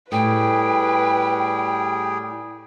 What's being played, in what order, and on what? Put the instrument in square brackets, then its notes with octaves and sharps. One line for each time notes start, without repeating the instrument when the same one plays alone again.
[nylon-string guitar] A2 [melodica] G3 G#4 [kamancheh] B4 [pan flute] G5